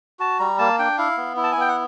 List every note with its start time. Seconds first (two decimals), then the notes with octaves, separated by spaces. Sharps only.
0.19 F#4 A5
0.39 G3 A#5
0.59 A#3 A5
0.79 D4 G5
0.98 E4 F5
1.17 B3
1.36 E4
1.44 A5
1.52 G#5
1.57 B3 G5
1.68 F#5